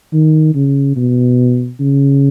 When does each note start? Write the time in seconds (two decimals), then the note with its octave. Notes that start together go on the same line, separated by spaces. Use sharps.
0.13 D#3
0.55 C#3
0.96 B2
1.80 C#3